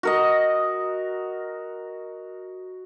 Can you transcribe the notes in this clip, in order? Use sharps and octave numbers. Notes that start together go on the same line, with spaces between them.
F#4 A#4 D#5